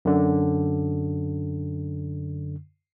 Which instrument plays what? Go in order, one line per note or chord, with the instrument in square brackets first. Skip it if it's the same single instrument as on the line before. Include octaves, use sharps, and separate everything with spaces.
[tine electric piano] F#2 D3